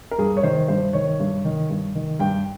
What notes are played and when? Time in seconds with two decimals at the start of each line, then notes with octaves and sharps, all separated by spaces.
0.11 A#4
0.18 G2 G#4
0.37 C#5
0.43 D#3 C5
0.68 G2 C5
0.93 D#3 C#5
1.20 G2
1.45 D#3
1.70 G2
1.95 D#3
2.19 G2 G5